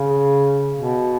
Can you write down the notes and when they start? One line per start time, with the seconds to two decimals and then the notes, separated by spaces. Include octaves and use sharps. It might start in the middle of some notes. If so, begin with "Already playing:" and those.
Already playing: C#3
0.76 B2